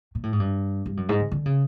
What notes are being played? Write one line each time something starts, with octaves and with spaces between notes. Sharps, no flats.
A#2
A2
G#2
G2
G2
F#2
G#2
D3
D3
C#3